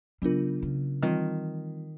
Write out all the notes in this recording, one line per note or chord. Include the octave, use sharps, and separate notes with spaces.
C#3 F#3 B3 D4 F4 A#4
C#3
D#3 E3 G3 C4 F4